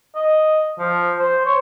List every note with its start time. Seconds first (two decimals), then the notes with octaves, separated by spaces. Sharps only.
0.15 D#5
0.78 F3
1.18 C5
1.45 C#5